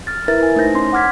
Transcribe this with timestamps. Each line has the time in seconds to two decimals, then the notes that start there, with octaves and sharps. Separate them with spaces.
0.07 F6 A6
0.28 E4 A#4 B4 E5 A6
0.43 G#5
0.56 A3 D#4 C5 G6 A#6
0.75 C#4 C6
0.93 F#5 D6 F6 G#6 B6